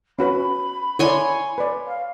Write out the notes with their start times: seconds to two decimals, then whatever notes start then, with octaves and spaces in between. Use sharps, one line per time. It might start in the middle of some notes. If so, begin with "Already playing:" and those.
0.19 C#4 F#4 B4 B5
0.99 E4 C#5 D5 G#5 C6
1.58 B4 D5
1.86 F5